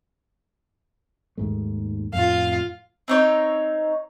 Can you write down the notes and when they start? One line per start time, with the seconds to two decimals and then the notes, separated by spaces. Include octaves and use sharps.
1.37 D#2 G#2 A3
2.13 F2 A2 F4 F5
3.08 C4 D#4 C#5